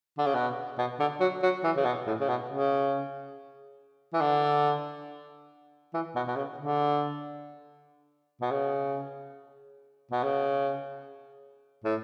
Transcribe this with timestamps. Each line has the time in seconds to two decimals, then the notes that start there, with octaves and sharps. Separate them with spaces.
0.18 D3
0.26 C#3
0.34 B2
0.78 B2
1.00 D3
1.20 F#3
1.43 F#3
1.64 E3
1.77 C#3
1.85 B2
2.07 A2
2.20 C#3
2.29 B2
2.50 C#3
4.14 E3
4.21 D3
5.94 E3
6.16 B2
6.28 B2
6.36 C#3
6.58 D3
8.41 B2
8.51 C#3
10.11 B2
10.23 C#3
11.84 A2